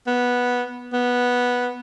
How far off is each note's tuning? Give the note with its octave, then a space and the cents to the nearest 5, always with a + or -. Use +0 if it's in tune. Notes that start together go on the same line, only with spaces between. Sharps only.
B3 -10
B3 -10